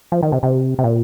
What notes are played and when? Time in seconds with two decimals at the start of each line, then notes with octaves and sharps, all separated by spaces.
0.12 F3
0.23 D#3
0.32 C3
0.43 C3
0.79 C3
0.84 A#2